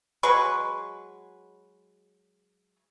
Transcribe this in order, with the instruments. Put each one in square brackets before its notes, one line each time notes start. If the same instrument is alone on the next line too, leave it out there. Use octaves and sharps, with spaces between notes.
[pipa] F#3 G#3 B4 C#6